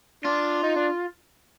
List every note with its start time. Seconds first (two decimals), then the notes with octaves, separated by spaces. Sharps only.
0.25 D4 F4
0.63 D#4
0.76 D4